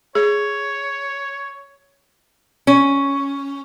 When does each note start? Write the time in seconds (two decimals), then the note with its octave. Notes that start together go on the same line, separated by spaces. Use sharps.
0.15 G#4 C#5
2.67 C#4